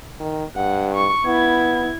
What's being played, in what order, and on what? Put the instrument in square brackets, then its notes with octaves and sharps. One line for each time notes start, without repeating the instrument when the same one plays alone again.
[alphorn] D#3
[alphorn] G2 [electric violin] F#5
[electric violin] C#6
[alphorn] B3 [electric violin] E4 G#6